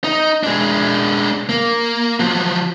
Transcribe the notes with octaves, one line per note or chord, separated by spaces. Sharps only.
D#4
G#3 D4
A#3
F3 F#3